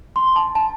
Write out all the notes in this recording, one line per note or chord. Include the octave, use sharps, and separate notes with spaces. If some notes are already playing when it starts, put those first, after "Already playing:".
C6
A5
A5